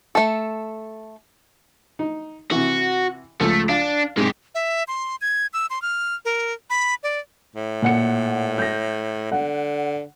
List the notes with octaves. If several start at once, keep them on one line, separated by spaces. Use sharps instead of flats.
A3 A4
D#4
C3 E3 F#4
C#2 F3 A3 A4
D4 F5
G#2 C3 G#3 G4
E5
C6
G#6
E6
C6
F6
A#4
B5
D5
A2
A#2 F#5 C#7
G6 A#6
D3 F#5